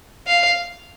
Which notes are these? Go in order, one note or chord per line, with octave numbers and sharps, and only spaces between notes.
F5